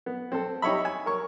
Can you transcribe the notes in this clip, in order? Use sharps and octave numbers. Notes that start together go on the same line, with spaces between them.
B3
C4 A4
D#4 G4 C#5 E5 B5
G#5
A#4 C#5 C#6